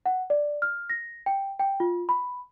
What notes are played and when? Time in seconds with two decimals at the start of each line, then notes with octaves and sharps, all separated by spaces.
0.06 F#5
0.30 D5
0.62 F6
0.90 A#6
1.26 G5
1.59 G5
1.80 F4
2.09 B5